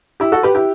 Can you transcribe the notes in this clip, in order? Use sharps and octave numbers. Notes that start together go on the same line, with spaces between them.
E4 G4
F#4 A4
G4 B4
E4 G4